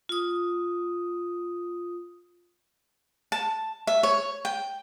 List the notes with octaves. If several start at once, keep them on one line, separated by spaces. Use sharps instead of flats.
F4 D#6
A5
E5
C#5
G5